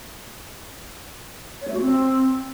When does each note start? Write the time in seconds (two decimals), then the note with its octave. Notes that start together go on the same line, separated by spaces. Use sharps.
1.61 C#5
1.68 A3
1.74 F#4
1.80 C4